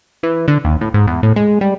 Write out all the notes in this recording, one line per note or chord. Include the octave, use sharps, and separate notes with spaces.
E3
D3
D#2
A2
G#2
E2
A2
G#3
G3